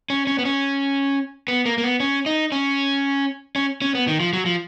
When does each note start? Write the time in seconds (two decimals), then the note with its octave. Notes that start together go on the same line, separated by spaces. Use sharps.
0.10 C#4
0.27 C#4
0.39 B3
0.45 C#4
1.48 B3
1.66 A#3
1.78 A#3
1.83 B3
2.00 C#4
2.26 D#4
2.52 C#4
3.56 C#4
3.82 C#4
3.95 B3
4.08 D#3
4.20 F3
4.33 F#3
4.46 F3